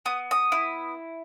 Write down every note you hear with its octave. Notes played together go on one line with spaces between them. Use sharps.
B3 D#6
D#6
E4